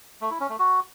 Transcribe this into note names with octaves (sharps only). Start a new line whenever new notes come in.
A3
E4
C#4
A3
F#4